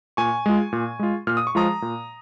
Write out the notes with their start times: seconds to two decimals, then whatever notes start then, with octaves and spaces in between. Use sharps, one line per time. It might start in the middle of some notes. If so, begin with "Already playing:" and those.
0.17 A#2 G#5 C#6
0.46 G#3 F4
0.73 A#2
0.99 G#3 F4
1.27 A#2 F6
1.37 D#6
1.47 C#6
1.55 F3 G#3 F4 A#5 D#6
1.82 A#2